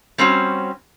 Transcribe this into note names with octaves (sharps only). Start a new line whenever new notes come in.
G3 C4 C#4 F#4